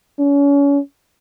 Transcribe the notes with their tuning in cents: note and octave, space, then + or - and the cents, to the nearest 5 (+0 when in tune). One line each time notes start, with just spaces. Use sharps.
C#4 +35